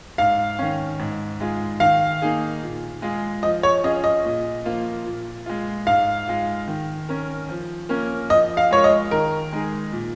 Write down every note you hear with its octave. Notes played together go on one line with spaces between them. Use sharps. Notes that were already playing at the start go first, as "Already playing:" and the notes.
G#2 F5
D#3 C#4
G#2
G#3 F4 G#4
D#3 F5
A#3 D#4 G#4
A#2
G#3 F4 G#4
F3 D#5
C#5
C#4 F4 G#4 D#5
D#5
A#2
F3 A#3 F4
A#2
G#3 F4
G#2 F5
G#3 F4
D#3
C#4 A#4
F3
A#3 C#4 A#4
F3 D#5
F5
G#3 F4 A#4 C#5
D#5
D#3 A#4
G#3 D#4 G#4
A#2